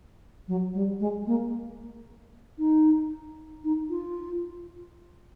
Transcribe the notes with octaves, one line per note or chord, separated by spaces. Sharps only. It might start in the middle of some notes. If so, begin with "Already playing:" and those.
F#3
G3
G#3
A#3
D#4
D#4
F4